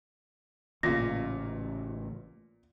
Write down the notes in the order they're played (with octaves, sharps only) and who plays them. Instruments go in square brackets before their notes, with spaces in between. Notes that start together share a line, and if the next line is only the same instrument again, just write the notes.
[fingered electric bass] A1 C#3 [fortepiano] A#2 F4 [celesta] A#6